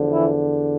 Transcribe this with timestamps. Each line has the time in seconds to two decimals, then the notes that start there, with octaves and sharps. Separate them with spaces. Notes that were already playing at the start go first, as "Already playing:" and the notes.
Already playing: E2 D3 F3
0.12 E3 E4